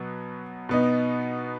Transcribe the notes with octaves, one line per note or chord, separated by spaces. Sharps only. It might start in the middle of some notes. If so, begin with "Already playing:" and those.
Already playing: B2 F#3 B3
B2 B3 D#4